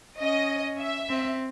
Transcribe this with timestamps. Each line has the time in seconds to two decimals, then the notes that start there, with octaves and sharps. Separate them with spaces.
0.19 C#4 D#5
0.79 E5
1.10 C4